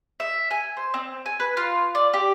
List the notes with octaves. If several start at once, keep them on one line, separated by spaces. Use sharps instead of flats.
E5
G#5
C5
C4
G#5
B4
F4
D5
G4